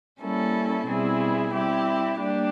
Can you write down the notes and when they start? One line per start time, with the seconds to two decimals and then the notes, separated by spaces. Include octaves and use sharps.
0.21 G3 A#3 C#4 E4 A4
0.88 B2 G3 C4 E4 G#4
1.53 G3 C4 E4 G4
2.19 G3 A#3 D4 G4